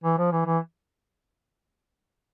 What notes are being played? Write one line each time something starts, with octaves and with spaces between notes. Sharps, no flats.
E3
F3
E3
E3